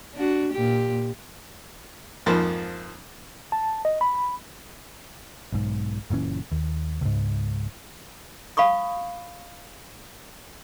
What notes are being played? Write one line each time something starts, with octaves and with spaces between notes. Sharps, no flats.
D4 F#4
A#2 G4
F2 G#2 F3 A#3 C5 B5
A5
D#5
B5
B1 G#2
F#1 A#2 E3 C#4
D#2
C#2 G#2
F5 B5 C#6 D#6